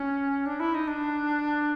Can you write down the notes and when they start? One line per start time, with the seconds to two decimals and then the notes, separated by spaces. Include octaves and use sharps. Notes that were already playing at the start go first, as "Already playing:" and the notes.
Already playing: C#4
0.46 D4
0.60 E4
0.74 D#4
0.88 D4